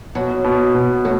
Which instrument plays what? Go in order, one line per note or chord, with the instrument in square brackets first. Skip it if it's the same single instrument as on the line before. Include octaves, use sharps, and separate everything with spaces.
[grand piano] B2 [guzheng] F#3
[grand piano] B2
B2
[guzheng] F#3 [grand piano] A3